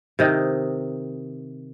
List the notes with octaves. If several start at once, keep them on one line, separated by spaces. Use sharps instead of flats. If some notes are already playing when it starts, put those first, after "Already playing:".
C3 D#3 D#5